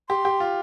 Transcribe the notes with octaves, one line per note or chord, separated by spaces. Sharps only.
G4 C6
G4
F4